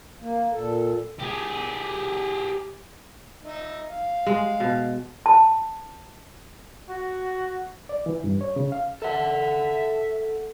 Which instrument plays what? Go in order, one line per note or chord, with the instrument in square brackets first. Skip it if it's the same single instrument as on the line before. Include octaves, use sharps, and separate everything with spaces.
[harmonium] A#3
A#2 A4
[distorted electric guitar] G4 G#4
[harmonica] D#4 E5
F5
[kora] G#3
B2
[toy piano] A5
[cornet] F#4
[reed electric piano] D5
E3
G2
C#5
C#3
F5
[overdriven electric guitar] A4 F#5 [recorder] E5